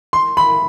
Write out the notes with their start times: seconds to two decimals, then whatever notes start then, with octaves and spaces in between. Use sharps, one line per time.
0.13 C6
0.37 B5